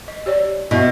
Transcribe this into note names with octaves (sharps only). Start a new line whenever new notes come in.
D#5
G4 C#5 D5
B2 E4 E5